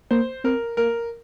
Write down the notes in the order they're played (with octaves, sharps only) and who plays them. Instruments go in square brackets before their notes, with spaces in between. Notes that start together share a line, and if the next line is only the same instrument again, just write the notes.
[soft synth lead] A#3 [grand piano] C5
[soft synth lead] C4 [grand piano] A#4
[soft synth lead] A#3 [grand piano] A#4